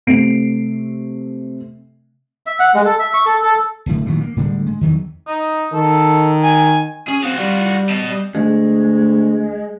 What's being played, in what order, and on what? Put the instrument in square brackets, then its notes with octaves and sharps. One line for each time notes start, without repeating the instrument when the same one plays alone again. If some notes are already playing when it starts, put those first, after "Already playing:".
[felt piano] C3 A3 C4 C7 D7
[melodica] E5
F#5
G#3
A4
E5
C#6
A4
A4
[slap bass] D1 A2 D3
A#2 D#3 E3 F#3
A#3
A2 D3 G3 G#3
G#3
E2 D#3 E3 F#3
[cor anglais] D#4
[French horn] D#3 [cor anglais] A4
[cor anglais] G#5
[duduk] C#4 [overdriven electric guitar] G#4
[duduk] C4 [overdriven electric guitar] F#4 F5
[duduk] G3 [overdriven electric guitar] F4 F#4
[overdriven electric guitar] D#5 A5
[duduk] G3
[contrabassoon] D2 [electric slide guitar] G#3